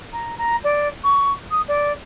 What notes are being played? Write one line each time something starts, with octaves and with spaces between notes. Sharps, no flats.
A#5
A#5
D5
C#6
D#6
D5